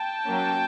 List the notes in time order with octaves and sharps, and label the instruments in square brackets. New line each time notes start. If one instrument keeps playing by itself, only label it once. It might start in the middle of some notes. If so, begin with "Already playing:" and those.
Already playing: [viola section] G5 A5
F#3 A#3 C#4